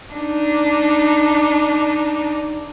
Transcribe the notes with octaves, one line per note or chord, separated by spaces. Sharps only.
D4 D#4